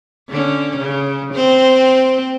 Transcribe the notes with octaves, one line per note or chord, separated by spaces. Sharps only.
D3 C#4
C#3
C4 C5